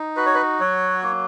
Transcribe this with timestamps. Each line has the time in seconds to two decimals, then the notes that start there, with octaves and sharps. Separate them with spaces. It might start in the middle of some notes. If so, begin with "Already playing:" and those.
Already playing: D#4
0.16 F#4 B4
0.26 C#5
0.34 B4
0.60 F#3 C#5
1.03 A#3